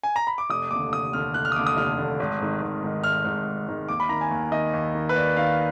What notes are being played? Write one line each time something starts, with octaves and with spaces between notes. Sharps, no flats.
G#5
A#5
B5
D6
F1 D#6
D#2 D3 D6
F1 D#6
D#2 D3 F6
F1 F#6
F6
D#6
D#2 D3 D6
D#6
F1 F6
D#2 D3
G#1
G#2 D#3
G#1
G#2 D#3
G#1 F6
G#2 D#3
G#1
G#2 D#3
D#2 D6
B5
D#3 A#5
G#5
D#2
D#3 D#5
D#2
D#3
B4
D#2 D5
D#3 F5